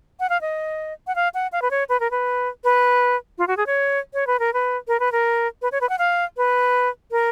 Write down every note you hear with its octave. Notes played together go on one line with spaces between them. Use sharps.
F#5
F5
D#5
F#5
F5
F#5
F5
B4
C#5
B4
A#4
B4
B4
F4
F#4
G#4
C#5
C#5
B4
A#4
B4
A#4
B4
A#4
B4
C#5
B4
F#5
F5
B4
A#4